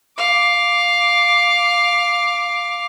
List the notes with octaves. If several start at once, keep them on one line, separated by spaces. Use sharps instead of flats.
F5 D6